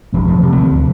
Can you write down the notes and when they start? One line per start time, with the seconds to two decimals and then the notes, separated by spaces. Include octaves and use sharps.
0.13 E1 F3 A3
0.27 E1 F3 A3
0.42 C3 A3 C4
0.57 D2 D3 F3